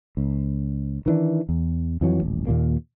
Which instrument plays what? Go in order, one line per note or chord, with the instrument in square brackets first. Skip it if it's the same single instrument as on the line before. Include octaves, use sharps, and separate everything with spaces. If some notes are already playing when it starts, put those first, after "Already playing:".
[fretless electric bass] C#2
D#3 E3 D4
E2
F2 E3 F#3
D#1 A1
D#2 A#2 A#3